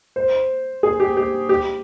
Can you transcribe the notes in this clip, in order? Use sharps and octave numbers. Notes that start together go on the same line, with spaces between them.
C5
G#4
G4
G4
G4